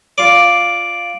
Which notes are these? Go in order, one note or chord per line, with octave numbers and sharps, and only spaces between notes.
F4 D5